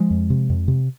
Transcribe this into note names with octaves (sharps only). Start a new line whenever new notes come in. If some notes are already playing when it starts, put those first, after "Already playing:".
Already playing: F3 G#3
F2
C3
F2
C3